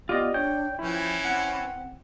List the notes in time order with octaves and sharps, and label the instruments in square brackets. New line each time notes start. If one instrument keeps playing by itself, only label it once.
[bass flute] B3 [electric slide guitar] F4 [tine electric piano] G4 D5 D#5
[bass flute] D4 [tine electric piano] C#5 [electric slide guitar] G5
[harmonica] E3 C#4 [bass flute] F3 [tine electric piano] E4
[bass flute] C4 [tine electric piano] F#5 F#6